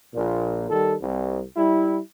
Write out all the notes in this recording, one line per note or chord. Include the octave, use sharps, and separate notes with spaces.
A#1 A#2
D#3 G3 A4
C2
G3 E4